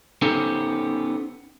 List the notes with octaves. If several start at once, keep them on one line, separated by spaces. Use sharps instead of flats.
B3 C#4 D#4 G4 A4 C5